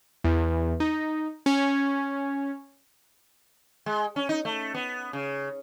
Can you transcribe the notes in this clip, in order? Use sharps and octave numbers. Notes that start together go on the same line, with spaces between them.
E2
D#4
C#4
G#3
C#4
D#4
A3
B3
C#3